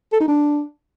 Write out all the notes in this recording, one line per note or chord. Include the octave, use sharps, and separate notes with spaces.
A4
D#4
D4